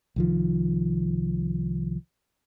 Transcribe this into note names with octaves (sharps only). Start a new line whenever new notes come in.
C2 D#3 F3